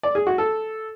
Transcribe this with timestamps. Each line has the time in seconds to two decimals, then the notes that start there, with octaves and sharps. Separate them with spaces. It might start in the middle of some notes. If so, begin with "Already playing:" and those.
0.03 D5
0.15 G#4
0.27 F#4
0.38 A4